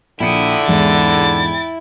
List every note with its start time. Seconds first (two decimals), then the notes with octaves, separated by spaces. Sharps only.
0.20 A#1 D3 E4 G5 D#6 C#7
0.68 E2 G#2 G#3 G5 A6